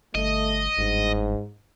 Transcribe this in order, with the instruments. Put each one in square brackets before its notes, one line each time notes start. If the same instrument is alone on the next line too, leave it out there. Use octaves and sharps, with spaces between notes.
[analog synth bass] G1 [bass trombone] A3 [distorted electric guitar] D#5
[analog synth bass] G1 [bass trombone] G#2